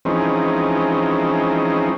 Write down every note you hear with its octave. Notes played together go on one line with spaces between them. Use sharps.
E3 F3 G#3 C4 C#4 D#4